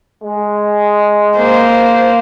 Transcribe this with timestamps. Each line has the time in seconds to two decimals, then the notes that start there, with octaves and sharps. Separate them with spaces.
0.23 G#3
1.36 A#3 C5